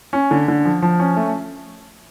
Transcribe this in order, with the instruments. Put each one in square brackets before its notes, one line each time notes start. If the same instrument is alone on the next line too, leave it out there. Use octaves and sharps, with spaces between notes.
[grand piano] C#4
D3
D3
F3
F3
C#4
A3